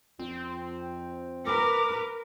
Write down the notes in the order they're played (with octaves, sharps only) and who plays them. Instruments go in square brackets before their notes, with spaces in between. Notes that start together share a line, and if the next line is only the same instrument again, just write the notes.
[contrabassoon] F2 [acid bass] C4
[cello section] A#4 B4 [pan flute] D6